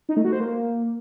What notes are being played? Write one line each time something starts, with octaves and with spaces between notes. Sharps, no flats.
D#4
A3
F#4
C5
A#3